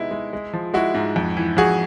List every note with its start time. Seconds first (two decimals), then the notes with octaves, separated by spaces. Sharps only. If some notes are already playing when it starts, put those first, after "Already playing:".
Already playing: C3 G#3 B3 D#4 E4
0.11 G#3
0.33 G#3
0.53 F3
0.74 G#3 E4 F#4
0.94 G#2
1.16 F2
1.37 E3
1.57 F2 F#4 G#4